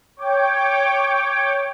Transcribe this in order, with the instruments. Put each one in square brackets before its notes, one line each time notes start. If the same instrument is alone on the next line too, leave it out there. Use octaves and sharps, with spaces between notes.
[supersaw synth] C#5 G5 D6